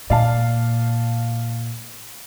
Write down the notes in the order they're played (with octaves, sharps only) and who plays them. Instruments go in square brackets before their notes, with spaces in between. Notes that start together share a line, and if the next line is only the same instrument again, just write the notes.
[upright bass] A#2 [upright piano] D5 F5 A5